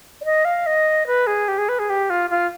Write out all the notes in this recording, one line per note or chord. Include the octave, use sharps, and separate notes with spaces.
D5
D#5
F5
D#5
B4
G#4
G4
G#4
B4
G#4
G4
F4
F4